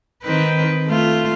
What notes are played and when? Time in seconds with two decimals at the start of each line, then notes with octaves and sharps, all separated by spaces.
0.23 D#3 C4 B4
0.87 A3 F4